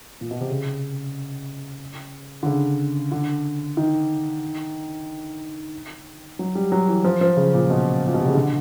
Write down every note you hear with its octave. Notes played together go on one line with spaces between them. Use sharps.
A#2
B2
C3
C#3
D3
C#3
D3
D#3
F#3
G3
F#3
E3
F3
F3
C#3
A#2
B2
A#2
B2
C3
C#3
D3